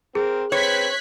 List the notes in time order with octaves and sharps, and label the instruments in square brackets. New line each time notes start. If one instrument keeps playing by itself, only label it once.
[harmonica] C4 A#4 [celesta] G#4
[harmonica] C4 B4 [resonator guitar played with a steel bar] C#5 [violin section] F#6 G#6 B6